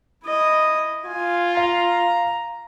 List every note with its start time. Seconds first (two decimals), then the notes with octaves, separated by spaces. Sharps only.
0.24 E4 D#5
1.06 F4 G#5
1.57 F5 A#5